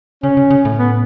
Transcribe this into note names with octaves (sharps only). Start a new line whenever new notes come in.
C#3 C#4
C#3
C#3
A2
B3